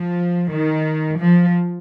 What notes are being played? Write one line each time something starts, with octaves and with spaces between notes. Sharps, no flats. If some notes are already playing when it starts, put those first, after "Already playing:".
Already playing: F3
D#3
F3